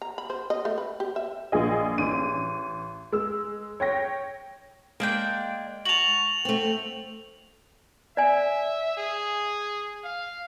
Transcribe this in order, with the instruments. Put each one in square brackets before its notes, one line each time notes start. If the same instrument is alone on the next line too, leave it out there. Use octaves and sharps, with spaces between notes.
[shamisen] A#5
B5
C5
D#5
A3
B4
G4
E5
[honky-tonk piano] A#1 F4 G#4 D#5
A1 D#7
G#3 E6
C#5 G5 A#6
[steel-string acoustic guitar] G#3 [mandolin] A#3 D4 G5
[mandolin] F#4 A5 [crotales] F7 F#7
[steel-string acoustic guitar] A3 C4
[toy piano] D5 G#5 [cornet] E5
[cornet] G#4
F5